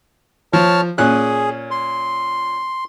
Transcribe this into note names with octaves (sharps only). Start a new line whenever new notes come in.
F3 C#5 A5 F6
A#2 C#4 G#4 F#6
C6